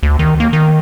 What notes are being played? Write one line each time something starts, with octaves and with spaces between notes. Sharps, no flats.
D2
D#3
A#3
D#3